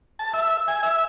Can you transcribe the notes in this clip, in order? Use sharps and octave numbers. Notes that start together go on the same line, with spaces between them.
A5
E5
G#5
E5